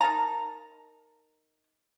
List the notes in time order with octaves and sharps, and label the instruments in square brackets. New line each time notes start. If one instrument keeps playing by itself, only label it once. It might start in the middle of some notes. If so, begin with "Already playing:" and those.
[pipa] D#4 A#4 A5 A#5